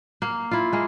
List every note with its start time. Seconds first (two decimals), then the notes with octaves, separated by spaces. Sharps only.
0.22 A#3
0.51 E4 F4
0.72 G#3 A#3